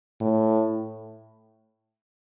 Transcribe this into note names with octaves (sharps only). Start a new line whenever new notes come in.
A2